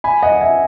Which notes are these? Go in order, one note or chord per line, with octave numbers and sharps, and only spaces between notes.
G#5 B5
D#5 F#5
E5 G#5